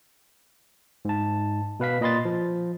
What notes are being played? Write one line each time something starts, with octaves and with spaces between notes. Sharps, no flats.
G#2 A5
B2 B4 F5 B6
A#2 D#5 B5 C6 A6
F3